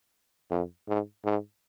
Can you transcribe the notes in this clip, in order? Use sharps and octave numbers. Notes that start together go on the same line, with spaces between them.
F2
G#2
G#2